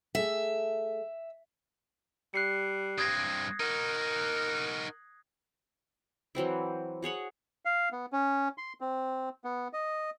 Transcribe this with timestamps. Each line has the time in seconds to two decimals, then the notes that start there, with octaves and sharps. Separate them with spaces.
0.15 A3 G#4 E5
2.34 G3 F#6 C7 C#7
2.98 G2 C4 D#6 G#6 A#6
3.60 D#4 F#4 A#4
6.35 E3 F#3 C4 E4
7.03 F#4 G#4 C#5 F#5
7.65 F5
7.92 B3
8.12 C#4
8.58 C6
8.81 C4
9.44 B3
9.73 D#5